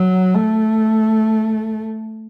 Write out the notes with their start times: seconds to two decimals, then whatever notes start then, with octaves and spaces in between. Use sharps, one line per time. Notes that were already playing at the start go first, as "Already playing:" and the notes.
Already playing: F#3
0.34 A3